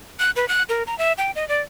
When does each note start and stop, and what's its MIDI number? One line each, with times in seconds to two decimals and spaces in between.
0.19 0.31 90
0.36 0.48 71
0.48 0.63 90
0.69 0.83 70
0.87 0.97 82
0.98 1.13 76
1.18 1.31 79
1.36 1.47 75
1.49 1.61 74